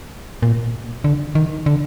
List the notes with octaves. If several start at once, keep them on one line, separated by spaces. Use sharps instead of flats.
A#2
D3
D#3
D3